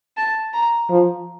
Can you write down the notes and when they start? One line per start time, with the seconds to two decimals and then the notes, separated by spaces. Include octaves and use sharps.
0.17 A5
0.53 A#5
0.90 F3